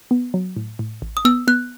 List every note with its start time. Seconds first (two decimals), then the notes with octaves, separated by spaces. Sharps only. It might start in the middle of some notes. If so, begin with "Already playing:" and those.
0.11 B3
0.34 F#3
0.57 A2
0.79 A2
1.02 A1
1.17 D#6
1.25 B3 E6
1.48 B3 F#6